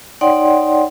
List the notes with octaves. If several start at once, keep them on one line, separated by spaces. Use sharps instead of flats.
D#4 C#5 D5 F#5 G5 C6